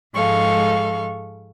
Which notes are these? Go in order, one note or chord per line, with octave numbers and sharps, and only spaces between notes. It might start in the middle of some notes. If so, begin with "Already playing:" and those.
G#2 F3 G#3 A4 F5 C#6